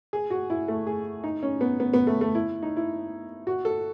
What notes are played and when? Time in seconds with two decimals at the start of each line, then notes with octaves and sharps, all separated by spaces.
0.13 G#4
0.30 F#4
0.50 E4
0.68 A3
0.87 G#4
1.24 D#4
1.43 C#4
1.61 B3
1.80 B3
1.93 B3
2.07 A3
2.21 A3
2.35 E4
2.63 D#4
2.77 E4
3.47 F#4
3.65 A4